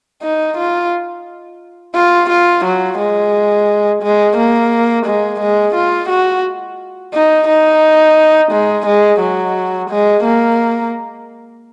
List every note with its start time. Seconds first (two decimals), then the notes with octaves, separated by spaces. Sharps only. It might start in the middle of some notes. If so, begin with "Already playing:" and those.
0.22 D#4
0.57 F4
1.95 F4
2.29 F4
2.65 F#3
2.98 G#3
4.02 G#3
4.36 A#3
5.06 G#3
5.40 G#3
5.75 F4
6.09 F#4
7.14 D#4
7.48 D#4
8.52 G#3
8.86 G#3
9.20 F#3
9.90 G#3
10.23 A#3